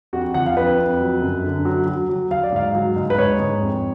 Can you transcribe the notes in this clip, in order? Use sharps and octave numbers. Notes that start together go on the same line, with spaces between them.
F2 F#4
F3 F#5
F5
F2 B4
F2
F#3
F#2
D3
F#3
F#3
F#3
F#3 F5
D5
G#2 F5
F#3
G#2
B4
G#2 C#5
G#2
F2